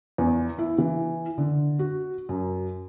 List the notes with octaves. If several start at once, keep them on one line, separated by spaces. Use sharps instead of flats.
E2
E4
E3
D3
F#4
F#2